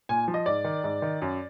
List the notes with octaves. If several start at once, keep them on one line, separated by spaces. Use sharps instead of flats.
A#2 G#5
F3
D#5
G#2 D5
D#3
G#2
D#3
F#2